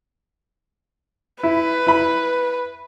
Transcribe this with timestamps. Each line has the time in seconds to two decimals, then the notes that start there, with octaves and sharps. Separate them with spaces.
1.43 E4 B4
1.87 E4 B5